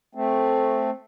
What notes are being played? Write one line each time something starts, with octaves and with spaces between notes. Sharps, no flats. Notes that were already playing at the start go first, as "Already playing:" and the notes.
A3 C4